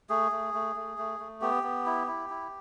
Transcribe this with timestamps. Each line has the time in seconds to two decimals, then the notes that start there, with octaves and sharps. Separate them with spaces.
0.10 A3 G#4
0.32 A3
0.54 A3
0.76 A3
0.98 A3
1.20 A3
1.41 B3 G4
1.63 B3
1.86 E4
2.07 E4
2.30 E4